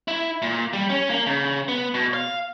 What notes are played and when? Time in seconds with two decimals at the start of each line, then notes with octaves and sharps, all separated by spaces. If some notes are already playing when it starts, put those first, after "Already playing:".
0.08 E4
0.42 A#2
0.73 G3
0.90 C#4
1.10 A#3
1.26 C#3
1.68 B3
1.94 B2
2.14 F5